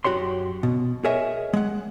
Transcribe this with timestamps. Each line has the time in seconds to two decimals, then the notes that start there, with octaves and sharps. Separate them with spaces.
0.05 F#2 F#4 G4 C#5 C6
0.63 B2
1.04 G#4 A#4 C#5 D#5 E5 G#5
1.53 G#3 F#5